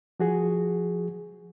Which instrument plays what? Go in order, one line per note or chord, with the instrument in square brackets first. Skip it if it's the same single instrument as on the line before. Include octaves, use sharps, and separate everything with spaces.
[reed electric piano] F3 F#4 G#4